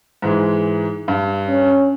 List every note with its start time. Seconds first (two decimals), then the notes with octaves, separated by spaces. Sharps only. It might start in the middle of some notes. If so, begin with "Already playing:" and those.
0.22 G#2 E3 G#3
1.08 G2
1.47 C#4